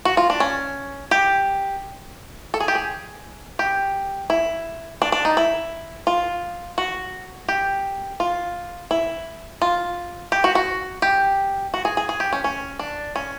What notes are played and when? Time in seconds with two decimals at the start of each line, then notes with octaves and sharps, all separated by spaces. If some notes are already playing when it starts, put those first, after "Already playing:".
0.05 F#4
0.17 F4
0.30 D4
0.40 C#4
1.11 G4
2.54 A4
2.60 G#4
2.68 G4
2.75 G#4
3.59 G4
4.30 E4
5.02 D4
5.12 D4
5.25 D#4
5.37 E4
6.07 F4
6.78 F#4
7.48 G4
8.20 F4
8.91 E4
9.62 F4
10.32 G4
10.44 F#4
10.55 F#4
11.02 G4
11.74 F#4
11.85 G#4
11.97 G#4
12.09 G#4
12.20 G4
12.33 C#4
12.44 C#4
12.79 D4
13.16 C#4